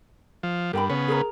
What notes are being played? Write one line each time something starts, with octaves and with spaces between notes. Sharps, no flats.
F3
G2 A#4 G5 B5
C#3 B3 C#5
G#4 A#4 A#5